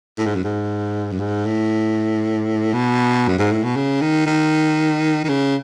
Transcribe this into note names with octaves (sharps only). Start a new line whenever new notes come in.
A2
G#2
F#2
G#2
F#2
G#2
A2
B2
F#2
G#2
A2
B2
C#3
D#3
D#3
D#3
C#3